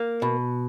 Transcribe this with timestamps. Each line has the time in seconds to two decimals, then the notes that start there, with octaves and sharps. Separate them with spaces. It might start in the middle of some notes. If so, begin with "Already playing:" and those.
Already playing: A#3
0.22 B2